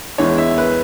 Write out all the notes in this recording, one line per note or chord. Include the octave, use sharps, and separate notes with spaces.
E2 E3 G#3 B3 C#5
E5
B4